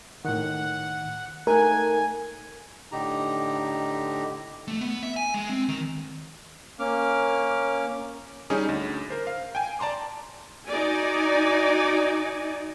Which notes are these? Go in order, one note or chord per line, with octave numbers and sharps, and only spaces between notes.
A2 D#3 F#5
A3 D#4 A#4 G#5 F#6
A2 D3 D#4 G4 A#5
A3
B3
E5
G#5
G#3
C4
D#3
A#3 C#4 D6 F6
G3 C#4 D#4 G4 G#4
D2
A#4 C5
F5
G5 G#5
D5 A5 A#5 C6 D6
D#4 F#4 D5 G#5